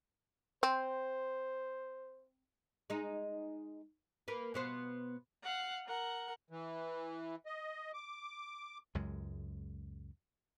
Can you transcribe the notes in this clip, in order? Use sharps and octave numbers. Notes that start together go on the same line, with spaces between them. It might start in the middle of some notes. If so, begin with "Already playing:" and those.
C4 C5
G#3 D#4
A#3 B4
B2 B3 C5
F5 F#5
A#4 F#5
E3
D#5
D6
C#2 F#2 G#3